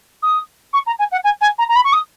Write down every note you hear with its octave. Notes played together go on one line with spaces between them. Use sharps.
D#6
C#6
A#5
G#5
F#5
G#5
G#5
A#5
A#5
B5
C#6
D#6